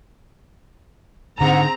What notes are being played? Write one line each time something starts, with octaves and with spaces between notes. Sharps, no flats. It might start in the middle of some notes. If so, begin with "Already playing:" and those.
G#2 D3 C4 G#4 F#5 A#5